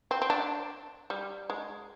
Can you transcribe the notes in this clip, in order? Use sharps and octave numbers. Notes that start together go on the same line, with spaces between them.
C4
C4
D4
G3
G#3